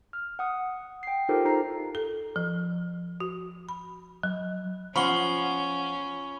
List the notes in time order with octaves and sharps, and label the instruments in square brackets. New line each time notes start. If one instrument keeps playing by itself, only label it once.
[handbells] F6
F#5 D#6
G5 C7
D#4 F4 G4 A4 A#4 C5
D#4 C5 A#5 C7
[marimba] A4
F3
F#4
B5
F#3
[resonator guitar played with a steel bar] F3 F#5 [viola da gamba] C#4 [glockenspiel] B5 C#6 G7